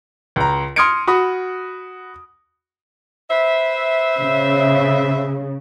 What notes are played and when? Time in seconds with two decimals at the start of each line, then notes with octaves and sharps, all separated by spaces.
0.36 C#2 A#5
0.76 C6 D#6 F6 G#6 C#7 D7
1.08 F#4 B5 D#6
3.30 B4 C5 E5
4.18 C#3